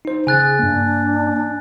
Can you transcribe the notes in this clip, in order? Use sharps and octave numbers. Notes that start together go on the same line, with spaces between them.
D#4 C5
C#3 G#4 G#5 F#6 A6
G2 A#3 D4